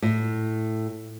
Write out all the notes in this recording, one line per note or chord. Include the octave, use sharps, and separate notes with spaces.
A2